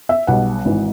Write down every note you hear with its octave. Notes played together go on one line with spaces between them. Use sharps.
E5
B1 B2 G3 F#5
G#1 G#2 E3